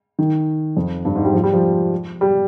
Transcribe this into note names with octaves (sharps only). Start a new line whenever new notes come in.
D#3
F2
G2
G#2
G3
F3
G3
F3
G3